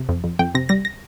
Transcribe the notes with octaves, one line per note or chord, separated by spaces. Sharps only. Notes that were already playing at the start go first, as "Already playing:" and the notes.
Already playing: C3
F2
F2
F2 G5
C3 A#6
G3 A#6
A#6